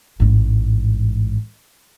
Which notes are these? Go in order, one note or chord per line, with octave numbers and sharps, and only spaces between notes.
A1 G#2